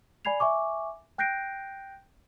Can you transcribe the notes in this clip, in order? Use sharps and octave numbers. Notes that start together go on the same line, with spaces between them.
D5 G#5 B5 G#6 C7 F7
E5 G#5 C#6 D6
G5 F#6 G6 A#6 C7 D7